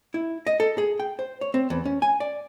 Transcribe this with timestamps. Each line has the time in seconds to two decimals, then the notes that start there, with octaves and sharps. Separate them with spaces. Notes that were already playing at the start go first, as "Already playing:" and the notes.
0.14 E4
0.47 D#5
0.60 A4
0.78 G#4
1.00 G5
1.19 C5
1.41 C#5
1.54 C4
1.70 E2
1.85 C#4
2.02 G#5
2.20 D5